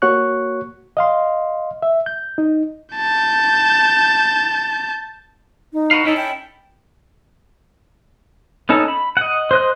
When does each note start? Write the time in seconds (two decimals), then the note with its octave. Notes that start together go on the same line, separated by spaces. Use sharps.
0.02 A#3 F#4 C#5 C#6 F#6
0.97 D#5 F5 C6
1.82 E5
2.06 G6
2.38 D#4
2.95 A5 G6
5.73 D#4
5.91 F#4 B4 F5
6.05 C#4 D#4 E4 A4
6.17 G5
8.69 B3 C#4 D#4 A4
8.88 B5
9.17 D#5 F#5
9.51 C5 D#5 F#6